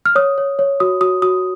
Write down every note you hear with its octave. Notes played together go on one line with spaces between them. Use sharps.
F6
C#5 D#6
C#5
C#5
F#4 D#6
F#4 D#6
F#4 D#6